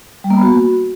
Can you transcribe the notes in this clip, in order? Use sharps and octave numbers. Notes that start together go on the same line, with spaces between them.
G3
A#3
B3
F#4